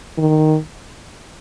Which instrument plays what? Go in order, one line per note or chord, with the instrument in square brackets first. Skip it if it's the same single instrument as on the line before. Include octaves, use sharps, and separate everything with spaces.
[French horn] D#3